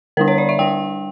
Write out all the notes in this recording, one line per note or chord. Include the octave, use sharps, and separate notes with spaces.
D3 G3 D4 A#4
C#5
D5
E5
G3 D4 G5